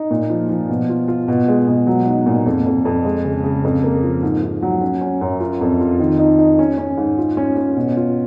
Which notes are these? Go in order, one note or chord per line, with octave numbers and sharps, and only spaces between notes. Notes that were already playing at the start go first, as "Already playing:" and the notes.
Already playing: D#4
A#2
F3
F3
B2
F4
F4
B2
G#3
B2
F#3
D#4
A#2
F2
F2
F2
G#3
C#3
C#3
F2
A#3
F3
G#2
G#2
F#3
C#4
C#4
F#2
F4
F2
F4
D#3
D#4
D#4
C#4
C#4
G#2
F4
C#4
C#4
B2
F4